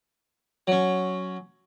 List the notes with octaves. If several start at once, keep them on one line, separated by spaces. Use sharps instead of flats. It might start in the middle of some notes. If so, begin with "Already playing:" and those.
F#3 C#4